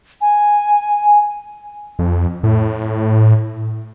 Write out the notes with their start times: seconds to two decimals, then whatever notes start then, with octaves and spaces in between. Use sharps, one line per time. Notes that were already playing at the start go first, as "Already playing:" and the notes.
0.21 G#5
1.99 F2
2.43 A2